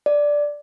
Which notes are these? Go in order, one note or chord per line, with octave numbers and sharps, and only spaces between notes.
D5